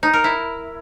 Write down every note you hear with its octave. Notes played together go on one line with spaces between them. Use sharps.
D#4
A#4
E4